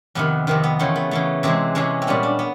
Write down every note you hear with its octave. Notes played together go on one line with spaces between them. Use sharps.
F2 C3 D#3 B3
F2 C3 D#3 C4
B3
C#3 E3 A3 C4
B3
C#3 E3 A3
C3 E3 G#3 C4
C3 E3 G#3 C#4
C4
A#2 G3 B3 C#4
D4
B3